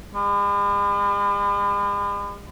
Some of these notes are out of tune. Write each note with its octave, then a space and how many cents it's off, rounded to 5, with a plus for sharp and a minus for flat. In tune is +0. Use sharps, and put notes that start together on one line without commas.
G#3 -45